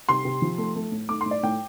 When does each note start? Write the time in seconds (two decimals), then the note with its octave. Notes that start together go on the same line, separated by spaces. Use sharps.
0.09 C3 C6
0.25 C3
0.42 F3
0.58 A3
0.76 A3
0.92 A2
1.09 A3 D6
1.21 C6
1.26 A2
1.31 D5
1.43 A2 G5